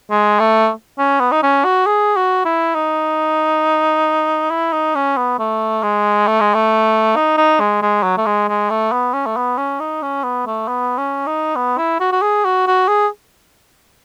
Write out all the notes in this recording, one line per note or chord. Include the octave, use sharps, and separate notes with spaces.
G#3
A3
C#4
B3
D#4
C#4
F#4
G#4
F#4
E4
D#4
E4
D#4
C#4
B3
A3
G#3
A3
G#3
A3
D#4
D#4
G#3
G#3
F#3
A3
G#3
G#3
A3
B3
C#4
A3
B3
C#4
D#4
C#4
B3
A3
B3
C#4
D#4
B3
E4
F#4
F#4
G#4
F#4
F#4
G#4